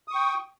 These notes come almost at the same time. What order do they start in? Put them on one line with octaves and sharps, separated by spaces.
D#6 C#6 G5